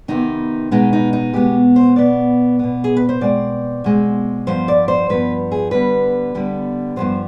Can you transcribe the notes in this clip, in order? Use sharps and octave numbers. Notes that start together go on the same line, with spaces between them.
C3 D#3 B3 D#4
B2 G#3 B3 D#4
D#4
D#4
B2 G#3 B3 G4
C5
B2 B3 D5
B2 B3
G#4
B4
C5
B2 G#3 C4 D5
B2 G#3 C4
G2 F3 B3 C5
D5
C5
G2 F3 B3 B4
G#4
D3 G3 B3 B4
D3 G3 B3
G2 F3 G#3 B3 C5